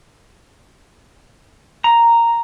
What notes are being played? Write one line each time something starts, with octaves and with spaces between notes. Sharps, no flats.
A#5